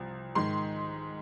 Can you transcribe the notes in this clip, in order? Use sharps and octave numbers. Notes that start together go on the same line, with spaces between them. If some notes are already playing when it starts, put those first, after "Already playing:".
Already playing: C2 F3
G#2 D#3 C6